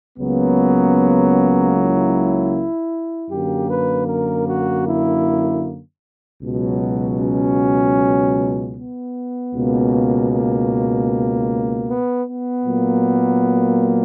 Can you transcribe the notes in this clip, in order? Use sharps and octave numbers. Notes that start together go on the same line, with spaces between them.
C#2 C#3 F#3 A#3 B3
E4
F#2 D3 A#3 G4
B4
A#4
F#4
E4
C#2 B2 F#3
C#4
B3
C#2 B2 A#3
A#3
B3
B3
A#2 F#3 A#3